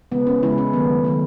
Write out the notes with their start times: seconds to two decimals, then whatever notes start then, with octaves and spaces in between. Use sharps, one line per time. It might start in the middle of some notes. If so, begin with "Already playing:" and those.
0.12 C#3 E3 G#3 B3
0.27 C#4
0.42 C#3 E3 G#3 E4
0.58 C#4
0.73 D#3 F#3 A3 B3
1.04 D#3 F#3 A3